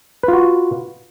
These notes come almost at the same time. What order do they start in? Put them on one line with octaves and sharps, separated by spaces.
B4 F4 F#4